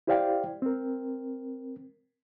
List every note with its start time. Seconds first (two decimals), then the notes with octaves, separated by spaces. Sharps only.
0.07 E4 G4 C5 D5 F5 G5
0.62 C4 A#4